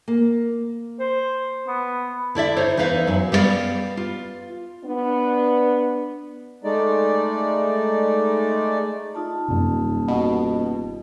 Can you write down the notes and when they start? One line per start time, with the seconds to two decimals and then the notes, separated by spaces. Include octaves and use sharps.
0.08 A#3
0.99 C5
1.67 B3
2.35 D3 E4 D5 E5
2.57 D#4 C5 C#5
2.77 E2 D#4 B4 E5 F5
3.07 F#2 F#4
3.32 G3 B3 F4 A#4 D5 F5
3.97 F4
4.83 B3 D4
6.64 G#3 A3 D#4 D5
9.15 D#4 F4 A5
9.49 D#1 F#2 C3
10.08 B2